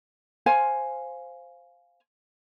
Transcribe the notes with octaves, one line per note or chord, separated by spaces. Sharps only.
C5 F5 G#5